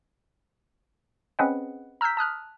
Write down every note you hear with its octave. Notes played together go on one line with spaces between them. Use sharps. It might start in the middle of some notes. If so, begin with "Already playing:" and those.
C4 C#4 G#4 B4 D#5 F#5
A#5 E6 F6 G6 B6
A5 D#6 F6 F#6